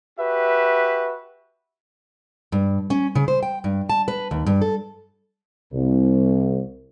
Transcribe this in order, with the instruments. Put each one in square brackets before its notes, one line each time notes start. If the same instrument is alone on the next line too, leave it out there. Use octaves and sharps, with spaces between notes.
[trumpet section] F#4 G4 B4 E5
[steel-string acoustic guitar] G2
C#4
C#3
C5
G5
G2
A5
B4
D#2
G2
A4
[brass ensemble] C2